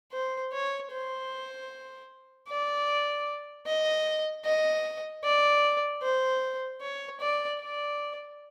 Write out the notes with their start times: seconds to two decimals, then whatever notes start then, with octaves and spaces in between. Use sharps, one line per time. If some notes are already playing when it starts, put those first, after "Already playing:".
0.12 C5
0.52 C#5
0.91 C5
2.48 D5
3.67 D#5
4.45 D#5
5.24 D5
6.02 C5
6.81 C#5
7.20 D5
7.60 D5